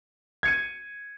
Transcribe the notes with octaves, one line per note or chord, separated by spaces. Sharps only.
G#6 C#7 D#7